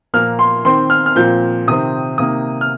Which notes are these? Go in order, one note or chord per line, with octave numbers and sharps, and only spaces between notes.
A#2 F3 A#3 F6
C6
D#3 C4 C6
F6
F6
A#2 F3 C4 G6
C3 D#3 C4 D#6
C3 D#3 A#3 D#6
F6